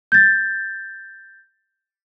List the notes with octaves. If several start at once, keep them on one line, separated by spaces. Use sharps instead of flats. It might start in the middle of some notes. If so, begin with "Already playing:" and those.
G6 A6